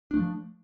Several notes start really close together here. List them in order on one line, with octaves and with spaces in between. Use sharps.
D4 A3 F3